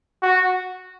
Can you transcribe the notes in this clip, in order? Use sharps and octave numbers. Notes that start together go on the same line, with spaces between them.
F#4